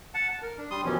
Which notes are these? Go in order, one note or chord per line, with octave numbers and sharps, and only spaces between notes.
F#5 A5
A5
A#4
D4
G3 C6 D#6
F#2 B2 E3 F3 G3 C#4